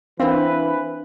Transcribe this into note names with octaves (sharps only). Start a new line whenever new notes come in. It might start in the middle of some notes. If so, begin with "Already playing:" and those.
E3 C4 D4 A#4 B4 F5